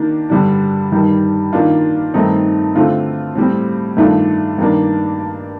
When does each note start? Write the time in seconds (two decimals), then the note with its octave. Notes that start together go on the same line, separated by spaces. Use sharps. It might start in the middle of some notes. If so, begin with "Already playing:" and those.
Already playing: D#3 A#3 D4
0.30 G2 D3 G3 D4
0.92 G2 D#3 G3
1.53 D#3 A#3 D4 F4
2.14 G2 D#3 A3 C4 D#4
2.75 D3 A3 C4 F4
3.36 A2 G3 C4
3.97 G2 D#3 A3 D4 F4
4.58 G2 D#3 A#3 D4